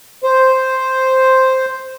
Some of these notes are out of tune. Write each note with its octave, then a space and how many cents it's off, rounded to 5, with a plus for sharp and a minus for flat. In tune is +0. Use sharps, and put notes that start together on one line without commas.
C5 +0